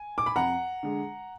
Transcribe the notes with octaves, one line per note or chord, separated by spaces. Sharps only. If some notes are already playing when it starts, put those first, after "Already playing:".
Already playing: G#5
D6
B5
F2 F#5 A#5
D3 G#3